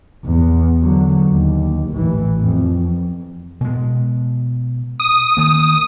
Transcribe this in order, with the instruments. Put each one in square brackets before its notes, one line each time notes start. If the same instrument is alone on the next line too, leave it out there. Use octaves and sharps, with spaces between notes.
[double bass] E2
D3 F#3
D#2
A1 E3
F2
[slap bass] B2 G#3
[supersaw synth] D#6
[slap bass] D#3 A#3